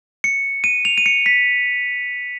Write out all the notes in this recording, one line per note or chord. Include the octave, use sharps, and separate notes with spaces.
C#7
D#7
F7
D#7
C#7
B6